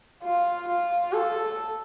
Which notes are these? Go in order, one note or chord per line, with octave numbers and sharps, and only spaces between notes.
F4
F4
A4